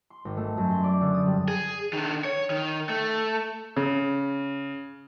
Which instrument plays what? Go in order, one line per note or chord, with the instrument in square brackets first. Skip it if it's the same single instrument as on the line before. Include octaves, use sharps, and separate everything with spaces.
[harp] C6
G#1
A3
F#2
C6
D5
D3
D#6
G3
[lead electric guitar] G#4
D#3 D4
C#5
D#3
A3
[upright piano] C#3